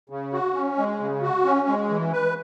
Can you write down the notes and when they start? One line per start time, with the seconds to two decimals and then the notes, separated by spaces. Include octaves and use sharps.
0.10 C#3
0.32 F#4
0.55 C#4
0.78 G#3
1.00 C#3
1.22 F#4
1.45 C#4
1.68 G#3
1.90 E3
2.12 B4